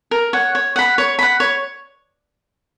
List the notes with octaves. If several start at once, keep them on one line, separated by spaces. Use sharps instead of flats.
A#4
C#5 F#5
C#5
F#5 B5
C#5
F#5 B5
C#5